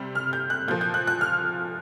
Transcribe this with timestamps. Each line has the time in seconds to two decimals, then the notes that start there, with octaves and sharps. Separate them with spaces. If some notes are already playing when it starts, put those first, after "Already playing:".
Already playing: C3 G3
0.15 F6
0.33 G6
0.50 F#6
0.68 A#2 F3 A#3 G6
0.81 G6
0.94 F#6
1.07 F#6
1.21 F6